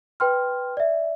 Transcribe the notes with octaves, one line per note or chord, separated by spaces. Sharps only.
B4 G5 C6 F6
D5 E5